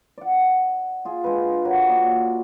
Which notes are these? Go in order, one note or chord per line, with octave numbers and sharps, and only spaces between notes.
D5 F#5
F4 G#4
G#3 D4 B4
F#4 A#4 B4 C#5
A#2 A#4 D5